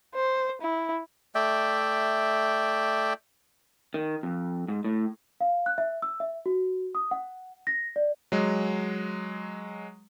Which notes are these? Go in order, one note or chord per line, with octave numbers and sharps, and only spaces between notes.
C5
E4
A3 D5 E5 G5
D#3
F2
G#2
A2
F5
F#6
E5
E6
E5
F#4
D#6
F#5
A#6
D5
F#3 G#3